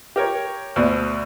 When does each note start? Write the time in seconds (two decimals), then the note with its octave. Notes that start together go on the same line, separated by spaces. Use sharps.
0.16 G4 A#4 C#5
0.76 D2 B2